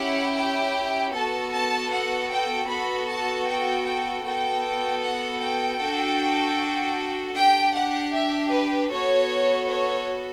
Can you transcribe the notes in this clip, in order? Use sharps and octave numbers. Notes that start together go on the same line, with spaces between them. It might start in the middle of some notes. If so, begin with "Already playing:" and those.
Already playing: C#4 E4 G4 F#5
G5
B3 F#4 A4 A5
A5
F#5
G5
B3 F#4 A4 B5
A5
G5
G5
B3 F#4 A4 G5
F#5
G5
D4 F#4 A4
D4 G4 G5
F#5
E5
B4
B3 F#4 A4 C#5
C#5